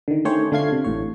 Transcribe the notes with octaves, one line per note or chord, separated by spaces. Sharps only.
D3 D#3
D#3 A3 C#4 G4 C5 C#5
D3 A3 F4 F5 G#6 C7
C3
A1 A2 C#5